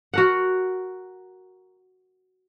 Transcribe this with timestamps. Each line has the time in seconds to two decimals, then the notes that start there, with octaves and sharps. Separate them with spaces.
0.14 F#4 A#4 F#5